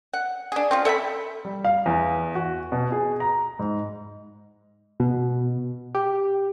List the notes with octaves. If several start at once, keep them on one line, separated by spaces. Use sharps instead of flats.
F#5
D4 G#4
C4 C#4 F4
A4 E5 G5 B5
G3
F5
E2
F#4
B2
G#4
A#5
G#2
B2
G4